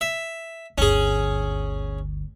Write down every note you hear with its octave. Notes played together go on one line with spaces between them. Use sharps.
E5
G1 D2 C#4 G#4